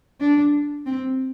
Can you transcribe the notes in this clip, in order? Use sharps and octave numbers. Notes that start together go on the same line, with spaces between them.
D4
C4